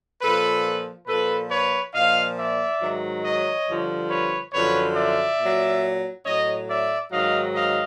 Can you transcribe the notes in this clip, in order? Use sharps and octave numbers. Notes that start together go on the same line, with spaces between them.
A#2 F3 A4 B4
A#2 F3 A4 B4
B4 C#5
A#2 F3 D#5 F5
D5 E5
G#2 D#3 F#3
C#5 D#5
G2 D3 F3
B4 C#5
F#2 D3 F3 B4 C#5
D5 E5
A#2 F#3
A2 F#3 C#5 D#5
D5 E5
G#2 D#3 F#3 D#5 F5
D#5 F5